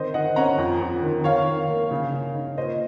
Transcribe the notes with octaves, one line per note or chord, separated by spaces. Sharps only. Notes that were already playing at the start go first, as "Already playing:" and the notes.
Already playing: D#3 C4 C5 D#5
D#3 D#5 F#5
C#4 F#5 A#5
F2
F2
D#3
D#3 C#5 F5
D#3
A#3
C#3
C#3
D#4
A#2 C5 D#5